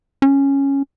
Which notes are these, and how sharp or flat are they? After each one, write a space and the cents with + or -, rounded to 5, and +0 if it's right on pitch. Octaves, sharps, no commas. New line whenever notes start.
C#4 -5